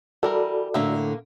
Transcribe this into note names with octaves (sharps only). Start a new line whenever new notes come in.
E3 G3 F#4 A4 A#4 D5
A2 D3 A#3 E5